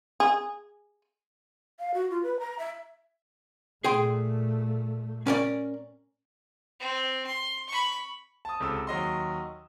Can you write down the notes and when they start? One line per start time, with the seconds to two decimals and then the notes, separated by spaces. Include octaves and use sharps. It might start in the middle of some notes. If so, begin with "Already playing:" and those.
0.20 G#4
1.79 F5
1.94 F#4
2.10 F4
2.23 B4
2.40 A#5
2.59 E5
3.84 A#2 A3 G#4 G5 C6
5.27 C#4 A#4 D5
6.80 C4
7.26 C6
7.68 B5 C#6
8.45 A5 D#6
8.60 C#2 C3 A4 E6 E7
8.87 D#2 F#3 D#5 C6